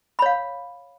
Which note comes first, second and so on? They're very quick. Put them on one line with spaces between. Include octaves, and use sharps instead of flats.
B5 C#5 F5